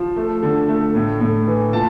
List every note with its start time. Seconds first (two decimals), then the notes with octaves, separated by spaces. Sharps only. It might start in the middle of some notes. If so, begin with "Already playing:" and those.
Already playing: F3
0.16 A3
0.43 D3
0.68 A3
0.95 A2
1.20 A2
1.47 E3
1.73 A#2 A5